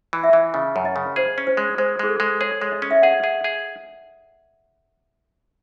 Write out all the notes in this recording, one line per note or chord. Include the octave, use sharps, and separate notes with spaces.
E3
E5
E3
C#3 D#5
F#2
D#5
C#3
G#4 C5
C#4
C5
G#3
G#3 C5
G#3 G#4
A4
G#3
G#4 C#5
G#3
D#5
C#4
E5
G#4 F#5
G#4
G#4